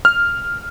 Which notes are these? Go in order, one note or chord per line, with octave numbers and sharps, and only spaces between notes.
F6